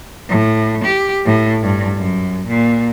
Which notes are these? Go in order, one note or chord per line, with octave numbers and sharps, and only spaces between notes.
A2
G4
A2
G2
F#2
A#2